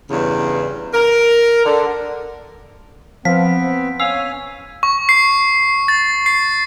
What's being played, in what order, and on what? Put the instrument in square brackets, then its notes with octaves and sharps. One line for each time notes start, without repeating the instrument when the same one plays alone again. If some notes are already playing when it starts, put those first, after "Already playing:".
[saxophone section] E2 G2 C#3
A#4
D3
[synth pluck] F3 [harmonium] B3 C4 [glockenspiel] B6
[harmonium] C#4 G#5 [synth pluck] F5 [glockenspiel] E6
[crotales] C#6
C7
A6
C7